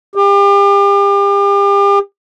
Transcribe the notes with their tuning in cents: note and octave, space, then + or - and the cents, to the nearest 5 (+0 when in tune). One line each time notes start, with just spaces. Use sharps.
G4 +35